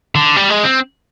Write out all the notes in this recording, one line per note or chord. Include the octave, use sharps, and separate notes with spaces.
D3
G3
G#3
C4